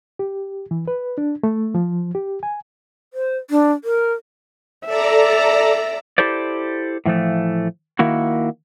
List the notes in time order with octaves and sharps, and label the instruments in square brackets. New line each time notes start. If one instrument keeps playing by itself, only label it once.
[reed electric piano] G4
E3
B4
D4
A3
F3
G4
G#5
[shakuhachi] C5
D4
A#4
[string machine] A4 D5 A#5 [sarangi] E5
[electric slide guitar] E4 G4 A4 C5 D5
A2 E3 F3 A3
D#3 A#3 E4 F#4